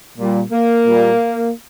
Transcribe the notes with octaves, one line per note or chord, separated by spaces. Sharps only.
A#2 G3
A#3
A#2 G3